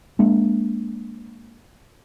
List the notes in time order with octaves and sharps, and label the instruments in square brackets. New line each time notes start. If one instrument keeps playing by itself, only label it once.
[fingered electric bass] G#3 A#3 D4